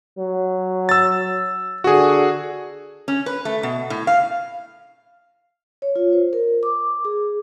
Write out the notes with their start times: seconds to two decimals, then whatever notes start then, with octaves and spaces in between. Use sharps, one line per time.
0.18 F#3
0.89 E6 A6
1.84 D3 F#4 G#4
3.08 C#4
3.26 B4
3.45 A3
3.63 B2
3.90 A2
4.07 F5
5.82 C#5
5.96 F4
6.13 C5
6.33 A#4
6.63 D6
7.05 G#4